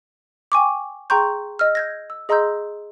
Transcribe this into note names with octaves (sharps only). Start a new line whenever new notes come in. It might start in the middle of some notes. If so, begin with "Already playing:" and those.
G5 G#5 C#6 D6
G#4 G5 A#5 C6 C#6 G6
D#5 E6 F6
G6 G#6 A#6
E6
G#4 D#5 A#5 C6 E6 G6